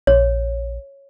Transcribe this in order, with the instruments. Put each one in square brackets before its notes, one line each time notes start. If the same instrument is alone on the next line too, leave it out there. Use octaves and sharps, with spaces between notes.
[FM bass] A#1 [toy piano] C#5